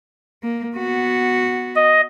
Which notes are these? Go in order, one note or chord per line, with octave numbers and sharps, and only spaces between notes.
A#3
B3 F#4
D#5